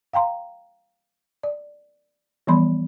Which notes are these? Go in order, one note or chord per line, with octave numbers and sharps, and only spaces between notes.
F5 G5 A#5 C6
D5
E3 F3 G3 B3 B5 C6